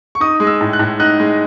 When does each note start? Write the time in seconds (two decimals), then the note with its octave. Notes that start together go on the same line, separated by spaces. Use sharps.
0.15 C#6
0.20 D#4 D#6
0.40 G#3
0.47 E6
0.61 A2
0.73 F#6
0.79 A2
1.00 D#4 F#6
1.20 G#3